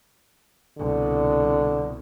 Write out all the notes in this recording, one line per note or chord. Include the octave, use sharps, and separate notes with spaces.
C2 B2 D3